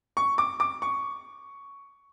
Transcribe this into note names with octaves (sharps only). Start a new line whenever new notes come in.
C#6
D6
D6
C#6